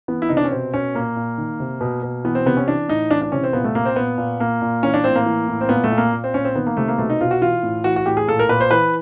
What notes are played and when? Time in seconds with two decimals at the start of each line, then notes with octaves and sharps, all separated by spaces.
0.08 E3 B3
0.22 E4
0.29 C3 D#4
0.37 D4
0.44 C#4
0.52 B2 C4
0.74 B2 C#4
0.94 A#2 A#3
1.16 A#2
1.38 D#3
1.60 C3
1.81 B2
2.03 B2
2.25 E3 B3
2.35 C4
2.46 C3 B3
2.57 C#4
2.67 E3 D4
2.89 A2 D#4
3.11 E3 D4
3.22 D4
3.32 C3 C#4
3.43 C4
3.53 A#2 B3
3.64 A3
3.75 A#2 A#3
3.85 C4
3.96 A#2 B3
4.18 A#2
4.39 A#2 A#3
4.61 A#2
4.83 E3 C#4
4.94 D4
5.04 A2 C4
5.15 A#3
5.26 E3
5.48 A2
5.61 C4
5.69 A#2 B3
5.84 A3
5.91 A#2
5.98 A#3
6.12 A#2
6.24 C4
6.34 A#2 C#4
6.45 C4
6.55 D#3 B3
6.66 A#3
6.77 C3 A3
6.88 A#3
6.98 B2 A3
7.10 D#4
7.21 B2 F4
7.31 F#4
7.41 E3 F4
7.63 A2
7.84 E3 F#4
7.96 F#4
8.06 A2 G4
8.17 G#4
8.27 A#2 A4
8.39 A#4
8.49 A#2 B4
8.60 C5
8.71 E3 B4